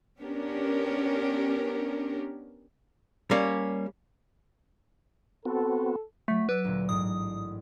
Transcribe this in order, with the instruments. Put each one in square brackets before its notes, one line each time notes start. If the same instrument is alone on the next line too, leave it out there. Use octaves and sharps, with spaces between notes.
[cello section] B3 C#4 D4 G4 A#4
[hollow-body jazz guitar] G3 A#3 C#4
[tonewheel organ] B3 C4 F#4 [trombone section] A4
[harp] F#3 B6 [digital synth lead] A3
[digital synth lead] B4 [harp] D5 E6
[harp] D2 A#2
[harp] A1 G#2 [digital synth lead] D#6